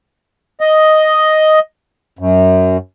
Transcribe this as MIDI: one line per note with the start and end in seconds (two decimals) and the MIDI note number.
0.61 1.59 75
2.19 2.77 42